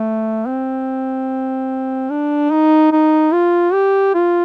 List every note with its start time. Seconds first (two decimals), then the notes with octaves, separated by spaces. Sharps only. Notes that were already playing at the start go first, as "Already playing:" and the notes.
Already playing: A3
0.47 C4
2.10 D4
2.51 D#4
2.92 D#4
3.33 F4
3.73 G4
4.14 F4